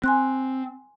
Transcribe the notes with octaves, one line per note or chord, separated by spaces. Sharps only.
C4 G#5 C6 F#6